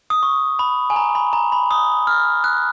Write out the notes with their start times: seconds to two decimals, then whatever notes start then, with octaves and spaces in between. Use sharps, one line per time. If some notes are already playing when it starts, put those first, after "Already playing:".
0.10 D#6
0.23 C#6
0.59 B5
0.90 G#5
0.96 A#5
1.15 B5
1.33 A#5
1.52 B5
1.71 D#6
2.07 F6
2.44 F#6